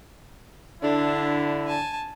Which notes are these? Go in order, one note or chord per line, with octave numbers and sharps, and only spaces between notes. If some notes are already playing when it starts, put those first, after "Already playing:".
D3 D4 E4
G#5 A5